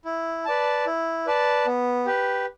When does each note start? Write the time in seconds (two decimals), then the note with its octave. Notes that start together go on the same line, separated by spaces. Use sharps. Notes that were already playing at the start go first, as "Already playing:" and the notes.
0.05 E4
0.45 B4 D5 A5
0.86 E4
1.26 B4 D5 A5
1.66 B3
2.06 G4 B4